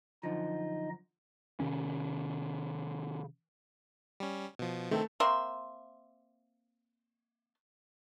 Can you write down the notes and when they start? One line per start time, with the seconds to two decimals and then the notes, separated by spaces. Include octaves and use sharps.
0.23 F#2 D3 F3 D#4 D#5
1.60 C3 D#3 C#4
4.20 G3 C#4
4.59 B2 F3
4.91 D#3 A3 C4 A4
5.20 A#3 C4 E5 C6